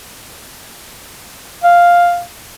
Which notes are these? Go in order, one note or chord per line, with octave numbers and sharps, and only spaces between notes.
F5